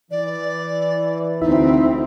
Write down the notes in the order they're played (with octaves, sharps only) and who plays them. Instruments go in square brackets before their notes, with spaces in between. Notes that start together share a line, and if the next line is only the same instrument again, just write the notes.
[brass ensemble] E3 [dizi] D5
[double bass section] D2 C4 [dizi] D#4 [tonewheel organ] E4